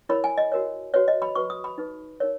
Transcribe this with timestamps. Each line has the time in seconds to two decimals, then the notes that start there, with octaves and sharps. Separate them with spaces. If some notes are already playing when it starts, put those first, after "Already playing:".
0.09 E4 A#4 C#5 B5
0.24 G#5
0.38 D#5
0.52 F#4 A#4 C#5
0.94 F#4 B4 C#5
1.08 D#5
1.22 B5
1.35 F#4 B4 C#6
1.50 D#6
1.64 B5
1.78 D#4 G#4 B4
2.20 D#4 A#4 C#5